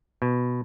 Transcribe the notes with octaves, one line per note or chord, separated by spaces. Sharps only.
B2